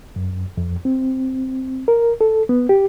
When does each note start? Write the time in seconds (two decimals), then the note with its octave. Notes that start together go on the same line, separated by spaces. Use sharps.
0.16 F#2
0.57 F2
0.85 C4
1.88 A#4
2.21 A4
2.49 B3
2.69 G4